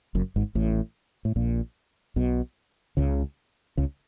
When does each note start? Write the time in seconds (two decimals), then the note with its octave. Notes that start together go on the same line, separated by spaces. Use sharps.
0.15 F#1 F#2
0.36 G#1 G#2
0.55 A1 A2
1.25 A2
1.36 A#1 A#2
2.16 B1 B2
2.97 C#2 C#3
3.77 C#2 C#3